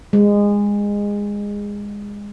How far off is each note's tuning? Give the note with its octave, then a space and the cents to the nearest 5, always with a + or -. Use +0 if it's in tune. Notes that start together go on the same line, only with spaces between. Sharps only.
G#3 -20